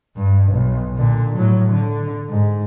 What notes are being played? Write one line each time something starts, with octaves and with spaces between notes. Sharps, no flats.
G2
B1
A#2 D3
A2 F#3
D3
G#2